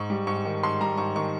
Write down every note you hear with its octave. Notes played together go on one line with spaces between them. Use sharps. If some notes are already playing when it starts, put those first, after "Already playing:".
Already playing: G#2 C#6
G3
G#2 C#6
D#3
G#2 C6
G3 A#5
G#2 C#6
D#3 C#6